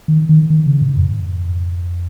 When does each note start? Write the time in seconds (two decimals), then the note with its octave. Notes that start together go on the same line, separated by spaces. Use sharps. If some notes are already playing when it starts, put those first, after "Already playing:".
0.08 D#3
0.29 D#3
0.50 D#3
0.66 C#3
0.82 G#2
0.97 F2